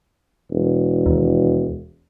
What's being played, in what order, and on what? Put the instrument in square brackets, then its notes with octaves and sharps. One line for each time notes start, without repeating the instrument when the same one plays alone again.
[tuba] E1
[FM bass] D#2